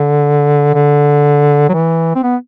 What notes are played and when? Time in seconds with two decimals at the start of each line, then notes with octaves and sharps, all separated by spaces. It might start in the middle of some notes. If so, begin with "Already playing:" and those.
Already playing: D3
0.75 D3
1.69 F#3
1.73 E3
2.15 C4
2.23 B3